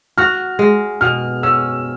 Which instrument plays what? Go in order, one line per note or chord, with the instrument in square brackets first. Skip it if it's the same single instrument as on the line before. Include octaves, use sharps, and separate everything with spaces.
[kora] F#4 [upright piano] F6
[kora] G#3
[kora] B2 [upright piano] F6
[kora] C#4 [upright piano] E6